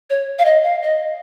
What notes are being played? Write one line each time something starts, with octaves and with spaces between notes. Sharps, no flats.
C#5
F5
D#5
F5
D#5